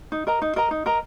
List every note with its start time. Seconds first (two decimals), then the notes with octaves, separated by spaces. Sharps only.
0.12 D#4
0.27 A#4 D#5 A#5
0.42 D#4
0.56 A#4 D#5 A#5
0.71 D#4
0.86 A#4 D#5 A#5